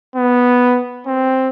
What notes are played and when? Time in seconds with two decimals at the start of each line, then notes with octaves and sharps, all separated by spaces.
0.16 B3
1.07 C4